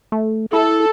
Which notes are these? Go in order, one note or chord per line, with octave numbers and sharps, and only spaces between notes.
A3
E4 A4